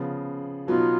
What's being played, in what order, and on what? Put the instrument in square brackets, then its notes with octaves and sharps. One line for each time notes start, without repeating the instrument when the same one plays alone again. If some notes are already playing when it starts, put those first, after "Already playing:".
Already playing: [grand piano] C#3 F3 B3
[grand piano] B2 F#3 B3 D#4 [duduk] F4